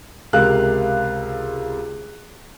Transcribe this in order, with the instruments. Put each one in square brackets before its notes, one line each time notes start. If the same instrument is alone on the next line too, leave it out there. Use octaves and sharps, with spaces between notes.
[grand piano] C#2 C3 A#4 F5 F#6